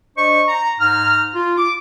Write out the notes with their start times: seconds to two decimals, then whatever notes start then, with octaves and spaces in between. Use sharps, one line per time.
0.17 D4 C5 D#5 C#6
0.48 A#5
0.81 G#2 D#4 A#5 F6
1.34 F4
1.58 D6